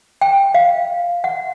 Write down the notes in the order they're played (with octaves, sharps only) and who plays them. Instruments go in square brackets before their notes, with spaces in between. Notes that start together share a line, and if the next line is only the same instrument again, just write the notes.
[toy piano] G5
F5
F#5